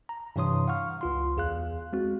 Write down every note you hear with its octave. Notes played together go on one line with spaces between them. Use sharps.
A#5
G2 C3 E3 C#5 C6 D#6
F5 F#5 C#6 F6
C#2 F4 C6
E2 G#4 F5 F#6
G#3 C4 F#4